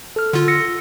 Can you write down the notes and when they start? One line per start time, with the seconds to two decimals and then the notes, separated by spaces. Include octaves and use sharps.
0.16 A4 F6
0.33 D3 F4
0.48 E6 A#6 C#7